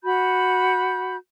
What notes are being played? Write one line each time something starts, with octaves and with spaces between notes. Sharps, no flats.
F#4 B5 G6